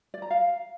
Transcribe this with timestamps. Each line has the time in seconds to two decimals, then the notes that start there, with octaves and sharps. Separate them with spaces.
0.14 D5
0.22 A#5
0.31 F5